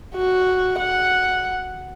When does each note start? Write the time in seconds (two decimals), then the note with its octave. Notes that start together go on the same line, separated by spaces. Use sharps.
0.16 F#4
0.79 F#5